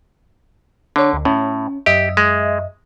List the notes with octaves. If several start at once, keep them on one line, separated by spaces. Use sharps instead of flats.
D3 D4 C#5
D2
A2 C#4
F#2 G4 D#5 E5
G#3